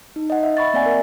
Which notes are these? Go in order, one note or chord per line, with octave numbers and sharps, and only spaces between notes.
D#4
D#5 F#5
E5
E5 B5 C#6 A6
A#3 C4 D5 E5 F#5 G#5
A#4